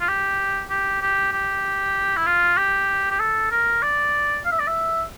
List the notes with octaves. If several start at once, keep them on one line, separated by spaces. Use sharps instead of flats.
F4
G4
G4
G4
G4
E4
F4
G4
G4
A4
A#4
D5
F5
E5
D5
E5